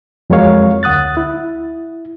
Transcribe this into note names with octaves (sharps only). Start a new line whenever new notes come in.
F2 F#3 G#3 A#4 C#5 F5
D2 F#5 D#6 F#6 A6
E4